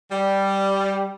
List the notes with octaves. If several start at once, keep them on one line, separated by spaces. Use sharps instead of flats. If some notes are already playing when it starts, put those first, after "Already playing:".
G3